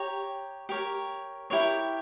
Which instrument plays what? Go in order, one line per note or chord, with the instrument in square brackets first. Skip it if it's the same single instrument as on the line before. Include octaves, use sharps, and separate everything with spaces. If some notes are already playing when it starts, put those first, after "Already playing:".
Already playing: [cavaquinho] G4 C#5 A#5
G4 A#4 C#5
E4 G4 A#4 C#5